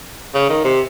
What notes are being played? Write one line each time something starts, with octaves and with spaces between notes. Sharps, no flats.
C#3
D#3
C3